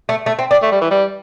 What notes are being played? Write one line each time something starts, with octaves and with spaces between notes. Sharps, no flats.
A3
A3
C4
D4
A3
G3
E3
G3